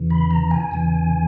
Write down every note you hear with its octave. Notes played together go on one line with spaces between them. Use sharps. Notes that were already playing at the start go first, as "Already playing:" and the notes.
Already playing: E2 C#3 E3
B5
A#5
G#5
E2 C#3 E3